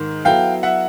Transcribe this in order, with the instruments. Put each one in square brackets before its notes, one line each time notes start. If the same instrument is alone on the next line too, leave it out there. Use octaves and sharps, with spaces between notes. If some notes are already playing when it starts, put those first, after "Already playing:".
Already playing: [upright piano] G#2 D#3
[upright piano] F#3 B3 E4 A4 [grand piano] F5 G5
[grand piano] E5 F#5